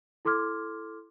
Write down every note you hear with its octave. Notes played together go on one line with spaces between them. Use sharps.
E4 A4 C6 D6 F6 G#6